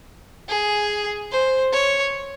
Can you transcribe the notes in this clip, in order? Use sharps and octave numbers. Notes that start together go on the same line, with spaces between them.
G#4
C5
C#5